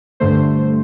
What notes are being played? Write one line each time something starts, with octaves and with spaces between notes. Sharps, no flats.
G2 D3 A3 C5